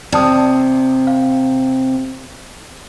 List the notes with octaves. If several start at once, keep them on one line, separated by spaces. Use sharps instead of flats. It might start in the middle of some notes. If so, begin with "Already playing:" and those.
C3 D5 A5 D#6
F5